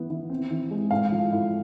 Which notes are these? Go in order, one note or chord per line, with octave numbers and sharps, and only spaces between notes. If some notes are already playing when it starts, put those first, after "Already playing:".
Already playing: E3 B3
E3
C4
E3
G#3
A2 F5
F3
A2